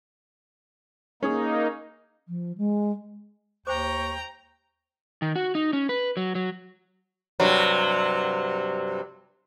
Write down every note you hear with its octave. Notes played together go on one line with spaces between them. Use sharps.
A#3 C#4 D#4 G#4
F3
G#3
D#2 C5 G5 A#5 C#6 D6
D#3
F#4
D#4
C#4
B4
F#3
F#3
G2 C3 F#3